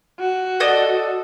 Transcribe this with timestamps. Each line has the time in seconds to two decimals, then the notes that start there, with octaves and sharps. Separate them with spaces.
0.19 F#4
0.60 A4 D5 D#5